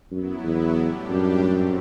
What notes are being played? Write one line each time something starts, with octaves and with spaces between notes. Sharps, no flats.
F#2 F#3 B3 E4
E2
A2 G3 D4 G4
F#2
G2 F#3 C4